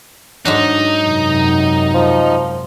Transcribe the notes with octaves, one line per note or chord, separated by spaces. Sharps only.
G#2 F#3 D4 D#4
F#2 C3
F3